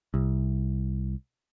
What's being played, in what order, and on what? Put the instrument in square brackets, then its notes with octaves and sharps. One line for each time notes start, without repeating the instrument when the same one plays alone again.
[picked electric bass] C2